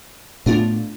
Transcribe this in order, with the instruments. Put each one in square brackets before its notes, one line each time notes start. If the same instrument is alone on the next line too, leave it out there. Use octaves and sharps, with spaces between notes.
[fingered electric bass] A2 B3 [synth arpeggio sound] A3 D4 F4